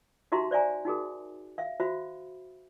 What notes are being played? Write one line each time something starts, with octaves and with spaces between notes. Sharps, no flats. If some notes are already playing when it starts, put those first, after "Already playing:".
D#4 F#4 G4 E5 A#5 C6
C5 D5 E5 G#5 A#5
D#4 F#4 G#4 A#4
E5 F5
F#4 C5 E5 B5